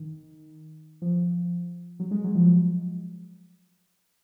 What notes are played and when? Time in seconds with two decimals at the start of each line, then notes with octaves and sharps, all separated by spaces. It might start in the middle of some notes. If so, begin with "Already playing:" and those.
Already playing: D#3
1.02 F3
2.00 F#3
2.11 G#3
2.24 F#3
2.35 F3